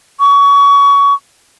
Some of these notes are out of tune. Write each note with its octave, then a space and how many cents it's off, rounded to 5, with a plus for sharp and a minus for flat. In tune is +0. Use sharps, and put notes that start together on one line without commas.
C#6 +25